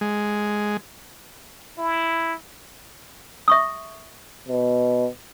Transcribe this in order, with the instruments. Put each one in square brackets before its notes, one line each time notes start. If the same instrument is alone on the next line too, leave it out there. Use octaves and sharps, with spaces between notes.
[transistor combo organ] G#3
[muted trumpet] E4
[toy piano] E5 C#6 D#6
[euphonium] B2